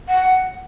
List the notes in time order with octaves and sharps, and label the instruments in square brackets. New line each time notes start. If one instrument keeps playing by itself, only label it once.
[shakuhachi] F#5